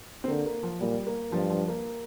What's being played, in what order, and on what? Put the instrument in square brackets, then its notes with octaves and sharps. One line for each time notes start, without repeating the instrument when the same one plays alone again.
[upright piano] C4
[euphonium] D3 [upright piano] A#3
[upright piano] A#3
F3
[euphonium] A#2 [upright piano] G3
[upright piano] A#3
[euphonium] G2 [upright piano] F3
[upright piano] F3
A#3